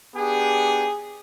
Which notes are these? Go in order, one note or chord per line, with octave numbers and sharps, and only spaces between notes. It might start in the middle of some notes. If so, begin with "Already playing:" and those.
B3 D4 G4 G#4